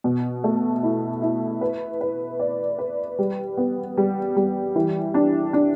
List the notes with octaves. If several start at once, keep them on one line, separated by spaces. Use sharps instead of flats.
B2
A3
E4
E4
B4
B4
D5
B4
G3
B3
G3
G3
E3
D4
D4